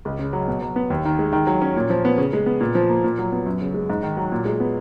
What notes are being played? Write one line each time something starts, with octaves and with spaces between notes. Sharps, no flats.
C#2
C#3
F#3
B2
F#3
B3
D#2
D#3
G#3
D#3
F#3
C#4
A#2
F3
B3
C#3
G#3
B3
A#2
F3
A#3
A#2
F#3
B3
F#2
C#3
G#3
G#2
D#3
F#3
A#2
G#3
B3